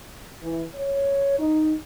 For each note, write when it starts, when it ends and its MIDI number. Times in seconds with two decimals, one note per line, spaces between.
0.42 0.62 52
0.75 1.37 73
1.39 1.72 63